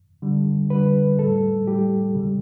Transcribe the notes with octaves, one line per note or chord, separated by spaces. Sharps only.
D3 G3
D3 G3 B4
A2 G3 A4
A2 G3 G4
C#3 G3